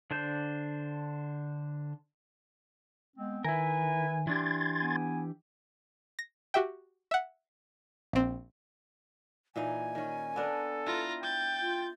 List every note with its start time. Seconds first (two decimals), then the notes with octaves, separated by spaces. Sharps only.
0.11 D3 D4 C5 G6
3.17 G#3 B3 C4
3.44 D#3 E4 A#4 B4 E5 G#5
4.27 E3 D4 G4 C6 G#6 A6
4.80 B3 G#5
6.19 A#6
6.54 F#4 G4 E5 G5
7.11 E5 F#5
8.13 A#1 C4
9.56 A#2 E3 D#4 G#5
9.95 D#3 C#4
10.36 B3 D4 A4 A#4
10.86 E4 F4 B4 A#5
11.22 G5 G6 A6
11.61 F4